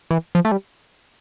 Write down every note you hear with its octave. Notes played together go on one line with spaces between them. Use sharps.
E3
F3
A3
G3